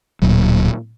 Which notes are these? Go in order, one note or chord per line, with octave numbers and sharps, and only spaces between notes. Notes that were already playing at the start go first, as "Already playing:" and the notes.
D1 A#2 F#3